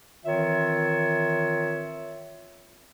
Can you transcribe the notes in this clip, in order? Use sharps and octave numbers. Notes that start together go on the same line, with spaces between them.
D#3 E3 C4 F4 C#5 E5